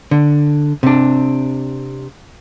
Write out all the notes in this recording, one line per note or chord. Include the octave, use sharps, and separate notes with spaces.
D3
C3 D4